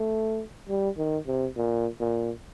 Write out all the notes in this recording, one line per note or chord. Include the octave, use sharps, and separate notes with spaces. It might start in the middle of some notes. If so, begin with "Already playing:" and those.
Already playing: A3
G3
D#3
C3
A#2
A#2